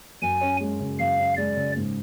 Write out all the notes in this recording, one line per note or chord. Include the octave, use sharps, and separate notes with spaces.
F#2 G#5
C#4
G#3
C#3
F#2 F5
C#4
G#3 D5
C#3
G#2